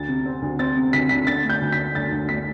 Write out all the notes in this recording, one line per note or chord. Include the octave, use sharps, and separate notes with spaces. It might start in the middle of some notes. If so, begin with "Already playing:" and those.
Already playing: D2 A6
C3
C4
D2
C4 A6
C3
D2 B6
D2 B6
D3 A6
A3 G6
D2
B6
A3
D2 A6
D2
A3 B6